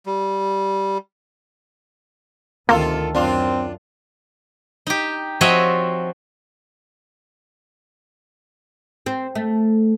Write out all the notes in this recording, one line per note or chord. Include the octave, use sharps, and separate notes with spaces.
G3
D2 C3 D#3 A#3 F4 A4
F#2 C4 D4 F4
D#4 G4
F3 C4 F#4 C#5 D#5 E5
C4
A3